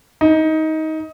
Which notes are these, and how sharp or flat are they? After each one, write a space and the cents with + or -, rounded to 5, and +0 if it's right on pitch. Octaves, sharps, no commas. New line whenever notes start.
D#4 +20